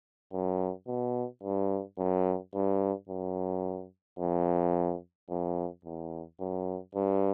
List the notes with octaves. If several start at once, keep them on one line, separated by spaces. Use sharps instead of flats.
F#2
B2
G2
F#2
G2
F#2
F2
F2
E2
F#2
G2